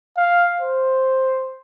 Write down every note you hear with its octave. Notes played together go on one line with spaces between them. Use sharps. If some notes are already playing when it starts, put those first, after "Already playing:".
F5
C5